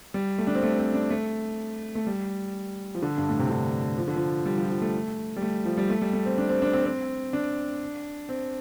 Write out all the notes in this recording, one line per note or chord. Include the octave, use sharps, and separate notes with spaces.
G3
A3
D4
C4
A3
C4
D4
A3
A3
G3
F3
D3
G2
A2
C3
D3
F3
D3
F3
G3
F3
F3
A3
G3
A3
F3
G3
A3
G3
A3
C4
D4
C4
D4
C4
C4
D4
C4